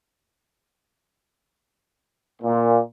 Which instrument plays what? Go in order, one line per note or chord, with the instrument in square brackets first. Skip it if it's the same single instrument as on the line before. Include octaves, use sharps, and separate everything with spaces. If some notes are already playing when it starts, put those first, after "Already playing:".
[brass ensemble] A#2